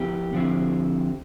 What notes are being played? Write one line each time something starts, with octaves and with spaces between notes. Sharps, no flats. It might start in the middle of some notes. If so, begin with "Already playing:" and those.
Already playing: F3 B3 E4 G4
D3 F3 C4 E4